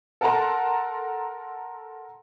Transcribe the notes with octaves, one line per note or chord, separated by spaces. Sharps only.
A4 A#4 F#5 A5 A#5 C6